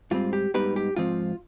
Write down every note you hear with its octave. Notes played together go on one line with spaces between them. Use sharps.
G#2 G3 C4 F4
G4
G#2 G3 B3 D#4 G4 B4
G4
G#2 F3 C4 F4